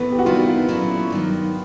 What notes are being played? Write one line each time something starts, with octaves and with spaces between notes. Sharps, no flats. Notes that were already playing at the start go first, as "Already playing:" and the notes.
Already playing: A2 E3 B3
G4
F#4
C3 D#3 G3 B3 E4 F4
A#2 F#3 A3 C#4 E4
G2 D#3 F#3